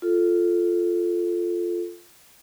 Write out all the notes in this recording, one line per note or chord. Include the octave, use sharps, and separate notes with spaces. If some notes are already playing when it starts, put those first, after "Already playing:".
F4 A4